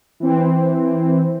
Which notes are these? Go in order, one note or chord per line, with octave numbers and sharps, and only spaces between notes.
E3 C4